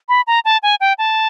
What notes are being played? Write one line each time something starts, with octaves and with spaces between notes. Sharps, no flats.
B5
A#5
A5
G#5
G5
A5